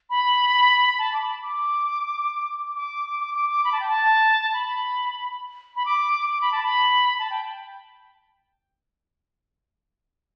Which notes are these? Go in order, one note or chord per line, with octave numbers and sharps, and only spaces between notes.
B5
A5
D6
B5
D6
D6
D6
D6
D6
B5
A5
G5
A5
B5
B5
D6
D6
B5
A5
B5
A5
G5